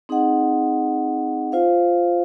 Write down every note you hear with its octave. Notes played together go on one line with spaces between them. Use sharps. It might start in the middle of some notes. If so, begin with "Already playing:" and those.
C4 D#4 G#4 D#5 F#5
F4 C5 F5